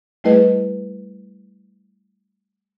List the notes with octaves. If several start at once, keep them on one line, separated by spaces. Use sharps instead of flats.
G3 A3 E4 G#4 B4 D#5